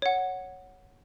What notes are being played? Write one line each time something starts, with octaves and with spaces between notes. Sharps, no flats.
C#5 F#5